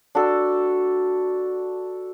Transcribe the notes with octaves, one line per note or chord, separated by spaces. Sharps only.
D4 F#4 A4